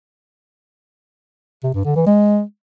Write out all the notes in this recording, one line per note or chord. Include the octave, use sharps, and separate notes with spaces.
C3
G2
D3
E3
G#3